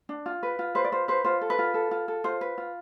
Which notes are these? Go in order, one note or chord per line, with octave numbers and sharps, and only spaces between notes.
D4
F4
B4
F4
B4 C5
D5
F4 C5
B4 C5
F4 C5
A4
B4
F4
A4
F4
A4
F4 C5
B4
F4